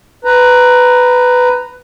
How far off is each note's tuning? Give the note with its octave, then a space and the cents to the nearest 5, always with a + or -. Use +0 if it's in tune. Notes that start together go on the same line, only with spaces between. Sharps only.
B4 +10 A#5 +0